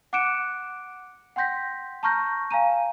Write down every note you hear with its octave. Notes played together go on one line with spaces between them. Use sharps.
F#5 D6 F#6 C#7 D7 E7
F#5 G5 C6 G6 A#6 B6
A5 A#5 C#6 F6 G6 A#6
F5 G#5 A#5 D#7